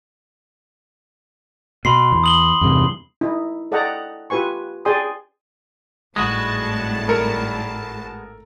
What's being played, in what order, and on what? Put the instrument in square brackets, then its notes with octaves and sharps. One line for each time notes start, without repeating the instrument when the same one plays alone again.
[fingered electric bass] B2 [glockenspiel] B5 C6 C7
[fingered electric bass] E2
[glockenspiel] D#6 F#7 G7
[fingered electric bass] E2 G2 C3
[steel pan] D#4 E4
A4 D5 D#5 F#5 G5 A#5
F4 G4 B4 G#5 C#6
G#4 D5 G5 G#5 C6 D#6
[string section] G#1 A2 A5 [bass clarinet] G3 [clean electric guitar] G#3 B3 F#4 [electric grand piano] D#6
[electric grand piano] A4 A#4 C#7